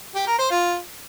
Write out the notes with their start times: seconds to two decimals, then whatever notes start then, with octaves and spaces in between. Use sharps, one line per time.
0.15 G4
0.27 A#4
0.39 C5
0.50 F4